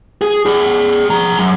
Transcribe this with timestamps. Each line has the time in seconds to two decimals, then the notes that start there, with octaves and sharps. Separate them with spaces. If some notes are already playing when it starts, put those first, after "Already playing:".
0.22 G#4
0.46 G#4 D5
1.10 F3 A#5
1.39 F#2